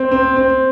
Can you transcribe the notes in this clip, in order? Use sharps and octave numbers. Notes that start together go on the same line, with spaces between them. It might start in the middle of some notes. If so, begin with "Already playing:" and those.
Already playing: C4
C4
C4